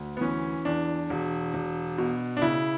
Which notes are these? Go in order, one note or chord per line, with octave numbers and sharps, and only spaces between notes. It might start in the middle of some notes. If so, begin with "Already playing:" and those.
Already playing: D2
B3
E3 C#4
E2 D4
E1
E1
B2
D4
C#3 E4